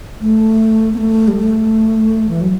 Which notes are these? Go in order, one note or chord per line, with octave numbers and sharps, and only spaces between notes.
A3
B3
A3
G3
A3
E3
F#3